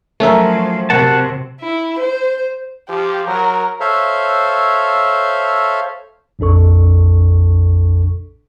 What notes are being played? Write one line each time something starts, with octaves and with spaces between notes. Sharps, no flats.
F3 F#3 A3 C#4 A#4 E5 A#5
C3 F#4 A#4 F#5 A5
E4
C5
F3 G4
F#3 A#4
A4 C5 C#5 E5 F5
A#1 F2 D4 A4 C#6